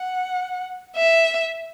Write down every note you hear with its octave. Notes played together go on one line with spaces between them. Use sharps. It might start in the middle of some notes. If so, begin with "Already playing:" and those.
Already playing: F#5
E5